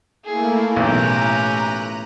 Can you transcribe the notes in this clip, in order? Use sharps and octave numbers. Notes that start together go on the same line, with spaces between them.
A3 A#3 E4 G#4
B1 A2 E3 C#4 G4 A#5 F#6 D#7